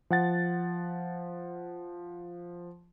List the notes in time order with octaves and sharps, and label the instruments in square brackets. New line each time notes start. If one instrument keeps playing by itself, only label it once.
[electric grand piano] F3 F#5 A6